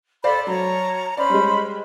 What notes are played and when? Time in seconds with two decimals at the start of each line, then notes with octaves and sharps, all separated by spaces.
0.24 A4 C5 D5 F5 B5
0.47 F#3 C#5 A5 A#5
1.17 C#4 C5 D5 B5
1.30 G3 G#3